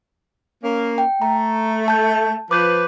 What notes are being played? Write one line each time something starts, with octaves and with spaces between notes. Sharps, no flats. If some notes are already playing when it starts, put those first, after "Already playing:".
A#3 C#4
G5
A3 A#5
A5 G6
F3 B4 D6 G6